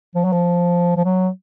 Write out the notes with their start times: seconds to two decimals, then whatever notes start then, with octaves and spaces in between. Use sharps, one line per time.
0.15 F3
0.24 F#3
0.32 F3
0.96 F3
1.05 F#3